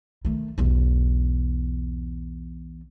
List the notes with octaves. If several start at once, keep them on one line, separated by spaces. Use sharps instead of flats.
D#3 A3
B1 E2